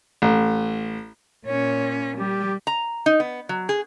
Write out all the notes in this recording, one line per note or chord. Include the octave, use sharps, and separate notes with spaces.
A1
A#2 C#4 C#5
G3 G4
A#5
D#4
B3
F#3
G#4